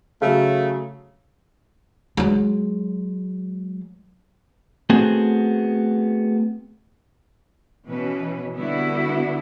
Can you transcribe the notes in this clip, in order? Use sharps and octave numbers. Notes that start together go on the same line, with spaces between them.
C#3 F#3 A3 F5
F#3 G#3
A3 B3 C4 F#4 G#4
B2 E3 C#4 B4
D3 G3 B3 E4 F#4